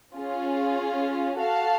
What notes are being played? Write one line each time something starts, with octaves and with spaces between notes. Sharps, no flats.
C#4 F4 G#4
F#4 A4 F5 A5